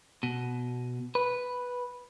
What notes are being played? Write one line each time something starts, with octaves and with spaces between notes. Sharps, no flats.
B2
B4